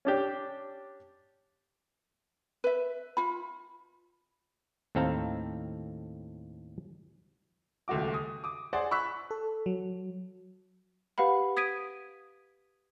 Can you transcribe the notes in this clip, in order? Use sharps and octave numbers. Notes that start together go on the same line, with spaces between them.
C#4 D4 G4
B4 E5
F4 B5
D#2 A2 C4 A4 F5 A#5
D#1 C#2 A3 F#4 D6
D#6
D6 D#6
G#4 C5 D5 F#5
B5 C#6 E6 F#6 B6
A4
F#3
G4 B4 F5 F#5 B5
D#6 G#6 B6 D7 D#7